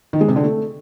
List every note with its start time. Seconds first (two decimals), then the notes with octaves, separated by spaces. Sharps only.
0.13 D#3
0.21 G#3
0.28 C3
0.36 D3
0.44 A3